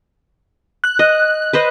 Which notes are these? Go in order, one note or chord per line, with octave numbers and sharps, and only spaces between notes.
F#6
D#5
B4 C5 D#5